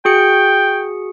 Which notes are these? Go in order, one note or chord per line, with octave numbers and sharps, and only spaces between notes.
F#4 G#4 G5 C#7